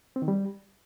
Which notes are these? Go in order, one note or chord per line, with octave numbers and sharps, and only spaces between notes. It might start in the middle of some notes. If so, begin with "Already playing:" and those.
C4
D#3
G3